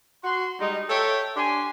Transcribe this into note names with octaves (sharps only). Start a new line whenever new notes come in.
F#4 C6
G3 G#3 D#4
A4 C#5 E5 G5
D4 G4 G#5 C6